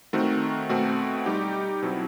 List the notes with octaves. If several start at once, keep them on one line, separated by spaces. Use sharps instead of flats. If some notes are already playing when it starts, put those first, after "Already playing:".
D#3 A3 C4 F#4
B2 A3 C4 F#4
G3 D#4 G4
B2 F#3 C4 E4